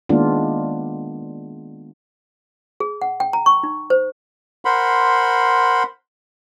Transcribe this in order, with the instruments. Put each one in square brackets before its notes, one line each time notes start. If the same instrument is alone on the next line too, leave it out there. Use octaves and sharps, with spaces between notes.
[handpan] D#3 G#3 A#3 B3 D4 F4
[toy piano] G#4
F#5
G5
A#5
C#6
D#4
C5
[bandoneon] A#4 C5 F#5 B5 C6